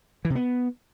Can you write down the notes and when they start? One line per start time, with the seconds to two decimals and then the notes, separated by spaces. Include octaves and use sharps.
0.25 E3
0.30 C3
0.35 B3